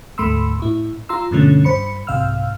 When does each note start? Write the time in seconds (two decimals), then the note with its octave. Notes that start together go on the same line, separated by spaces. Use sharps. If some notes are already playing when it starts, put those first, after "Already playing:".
0.18 D2 G#2 A3 B5 C6 E6
0.60 A2 E4
1.09 F4 A#5 C6 E6
1.31 G2 B2 D3 F3 A3 C#4
1.64 G2 C5 B5 C#7
2.07 C2 G#2 C3 F5 E6 F6